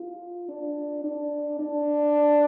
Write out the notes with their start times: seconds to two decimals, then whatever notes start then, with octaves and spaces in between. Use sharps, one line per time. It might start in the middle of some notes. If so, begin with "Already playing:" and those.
Already playing: F4
0.48 D4
1.04 D4
1.59 D4